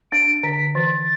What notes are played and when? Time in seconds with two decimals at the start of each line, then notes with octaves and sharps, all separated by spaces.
0.12 D4 D7
0.43 D3 B6
0.75 E3 A6